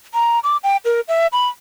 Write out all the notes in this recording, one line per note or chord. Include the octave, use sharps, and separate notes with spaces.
A#5
D6
G5
A#4
E5
B5